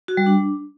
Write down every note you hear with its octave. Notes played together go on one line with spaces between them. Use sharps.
F#4
G3
D4